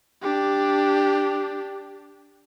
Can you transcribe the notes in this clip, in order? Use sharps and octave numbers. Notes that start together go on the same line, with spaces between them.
D4 G4